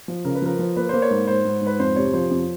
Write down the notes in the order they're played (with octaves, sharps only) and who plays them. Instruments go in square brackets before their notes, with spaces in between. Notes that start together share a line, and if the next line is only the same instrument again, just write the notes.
[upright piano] F3
[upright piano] C#3 [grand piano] A#4
[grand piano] B4
[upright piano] F3 [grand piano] A#4
[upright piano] F3
[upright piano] A#3 [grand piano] B4
[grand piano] C5
[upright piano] A#3
[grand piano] C#5
[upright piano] G#2
[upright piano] G#2 [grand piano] C5
[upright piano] G#2
G#2
[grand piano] B4
[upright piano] F2 [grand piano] C5
[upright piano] C3 [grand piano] C#5
[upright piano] F3 [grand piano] C5
[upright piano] F2